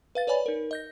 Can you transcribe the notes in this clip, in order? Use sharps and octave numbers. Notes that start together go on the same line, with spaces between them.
B4 F5 A6
B4 C#5 D5 G#5 B5
D#4 A#4
D#5 G6 A#6